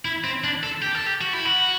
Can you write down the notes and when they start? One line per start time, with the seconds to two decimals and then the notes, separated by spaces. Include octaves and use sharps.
0.05 E4
0.24 C4
0.44 D4
0.63 A4
0.82 G4
0.95 A4
1.06 G4
1.21 F#4
1.33 E4
1.45 F#4